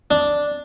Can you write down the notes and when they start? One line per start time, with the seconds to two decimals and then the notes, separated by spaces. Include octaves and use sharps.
0.11 D4